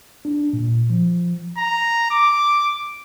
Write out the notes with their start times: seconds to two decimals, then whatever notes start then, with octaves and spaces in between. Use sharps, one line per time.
0.25 D4
0.53 A#2
0.90 F3
1.58 A#5
2.11 D6